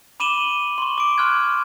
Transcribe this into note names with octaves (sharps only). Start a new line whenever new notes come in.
B5 D6 D#7 E7 F#7 G7
C6 C#6
D6 D7
C6 F6 F#6 G#6